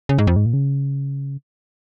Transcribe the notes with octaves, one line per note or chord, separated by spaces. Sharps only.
C#3
G#2
F2
G#2
A#2
C#3